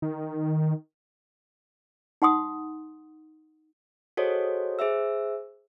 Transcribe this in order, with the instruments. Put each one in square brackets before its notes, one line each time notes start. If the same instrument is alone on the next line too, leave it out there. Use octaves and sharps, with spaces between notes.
[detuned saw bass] D#3
[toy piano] D#4 F#5 C6 D#6
[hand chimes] F#4 G#4 A4 C5 C#5 D#5
G#4 C5 E5 E6